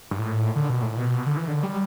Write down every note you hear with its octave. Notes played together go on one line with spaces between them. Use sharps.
G2
A2
D3
B2
A2
B2
D3
E3
D3
G3